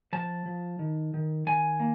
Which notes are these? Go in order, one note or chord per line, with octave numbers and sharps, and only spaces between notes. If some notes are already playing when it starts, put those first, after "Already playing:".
F3 A5
F3
D#3
D#3
D#3 G#5
A#3